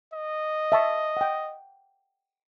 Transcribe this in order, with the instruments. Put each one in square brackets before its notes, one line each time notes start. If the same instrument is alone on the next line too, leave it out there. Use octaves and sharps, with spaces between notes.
[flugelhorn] D#5
[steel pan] E5 A5 C#6
F#5 G5